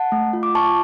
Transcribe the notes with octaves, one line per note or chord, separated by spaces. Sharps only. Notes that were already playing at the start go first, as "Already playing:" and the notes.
Already playing: F#5 A5
A3
F4
D6
F4 A5 C#6